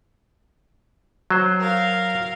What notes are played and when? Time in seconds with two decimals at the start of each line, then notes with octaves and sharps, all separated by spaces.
1.30 F#3 C5
1.60 A#4 F5